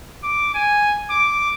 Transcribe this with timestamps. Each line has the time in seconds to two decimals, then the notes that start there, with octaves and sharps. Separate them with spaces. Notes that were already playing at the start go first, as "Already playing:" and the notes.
0.23 D6
0.55 G#5
1.10 D6